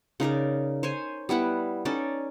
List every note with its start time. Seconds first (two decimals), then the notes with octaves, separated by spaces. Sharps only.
0.20 C#3 D#4 A#4 D5
0.83 C5 C#5 G#5
1.29 G3 B3 E4 F#5
1.85 C#4 D#4 A4 D5